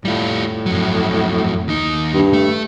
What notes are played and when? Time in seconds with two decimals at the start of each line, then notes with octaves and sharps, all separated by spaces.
0.05 A2 G3 F4
0.66 F2 F#3
1.68 D#2 D#4
2.14 G2
2.33 A3